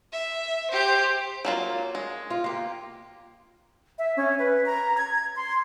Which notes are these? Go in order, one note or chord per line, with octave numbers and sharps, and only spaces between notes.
E5
G4 C5
F#3 A#3 F4
G#3
F4
A#3 G4
E5
C#4
B4
A#5
G#6
C6